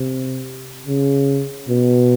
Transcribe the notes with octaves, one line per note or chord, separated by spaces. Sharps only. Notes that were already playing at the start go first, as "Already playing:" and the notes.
Already playing: C3
C#3
B2